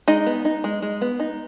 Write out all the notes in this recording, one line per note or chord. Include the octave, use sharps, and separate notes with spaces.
G#3 D#4 D#5
B3
D#4
G#3
G#3
B3
D#4